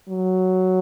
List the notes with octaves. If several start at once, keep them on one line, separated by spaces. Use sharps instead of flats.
F#3